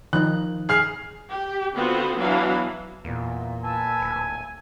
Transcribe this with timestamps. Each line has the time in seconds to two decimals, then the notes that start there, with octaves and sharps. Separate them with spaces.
0.13 D#3 F3 D#4 F#6
0.69 G#4 F6 C7
1.31 G4
1.74 D3 B3 C4 F4 F#4 C5
2.17 E3 F#3 B3 D4 F#4 F5
3.04 E2 A#2
3.63 B4 G#5 A5 E6
4.00 D1